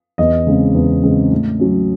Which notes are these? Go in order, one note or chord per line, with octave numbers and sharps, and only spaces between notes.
E2 D#5
C#3 G#3 C4
E2
C#3 G#3 C4
A2
F#3 C#4